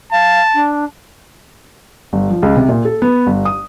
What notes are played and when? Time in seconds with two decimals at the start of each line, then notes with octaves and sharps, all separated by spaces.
0.12 F5 A5
0.54 D4
2.13 G1
2.30 F3
2.42 C#2
2.57 C3
2.69 A#2
2.85 A4
3.02 B3
3.27 G1
3.45 D#6